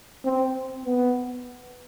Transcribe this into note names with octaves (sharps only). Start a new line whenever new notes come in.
C4
B3